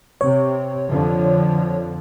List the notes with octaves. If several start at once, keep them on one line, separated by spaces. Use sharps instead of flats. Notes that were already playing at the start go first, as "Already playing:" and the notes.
C3 C#5
F2 D3 F3